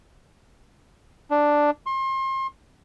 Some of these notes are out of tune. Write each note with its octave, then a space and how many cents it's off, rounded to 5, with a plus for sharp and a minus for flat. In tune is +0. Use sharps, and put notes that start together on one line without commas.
D4 +5
C6 +35